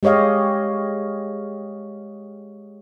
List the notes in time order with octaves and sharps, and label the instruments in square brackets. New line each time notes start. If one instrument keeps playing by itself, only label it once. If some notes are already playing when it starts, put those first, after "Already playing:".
[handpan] G#3 G4 C#5 D#5 F5